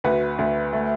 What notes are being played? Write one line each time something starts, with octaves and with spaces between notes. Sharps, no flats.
D2 F#4 B4
D2
A3